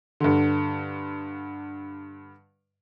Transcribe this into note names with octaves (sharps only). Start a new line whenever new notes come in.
G2 D3